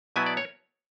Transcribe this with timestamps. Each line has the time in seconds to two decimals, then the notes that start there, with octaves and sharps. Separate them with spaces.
0.16 B2 F#3 B3 E4 G#5
0.26 D5
0.37 C#5